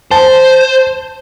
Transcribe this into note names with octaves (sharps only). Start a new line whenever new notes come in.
C5 A5